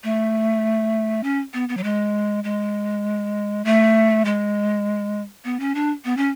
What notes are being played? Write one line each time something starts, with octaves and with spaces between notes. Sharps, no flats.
A3
C#4
B3
B3
F#3
G#3
G#3
A3
G#3
B3
C#4
D4
B3
C#4